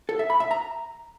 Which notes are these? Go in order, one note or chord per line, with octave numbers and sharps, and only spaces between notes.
A4
E5
B5
E5
A#5